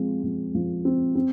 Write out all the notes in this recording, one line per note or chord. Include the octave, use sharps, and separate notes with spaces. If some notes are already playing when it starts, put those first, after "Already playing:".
Already playing: F3 G#3 C4
F3
F3
C4
C4